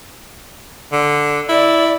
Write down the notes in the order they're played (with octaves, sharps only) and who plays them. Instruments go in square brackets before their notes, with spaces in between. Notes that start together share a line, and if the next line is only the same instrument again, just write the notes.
[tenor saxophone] D3
[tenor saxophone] E4 [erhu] D5